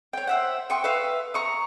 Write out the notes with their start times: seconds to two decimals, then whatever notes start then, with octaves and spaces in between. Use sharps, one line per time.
0.13 C#5 G5
0.27 C5 E5 F#5
0.70 G5 C6 C#6 D#6
0.84 B4 E5 F5
1.34 A#5 C#6 D#6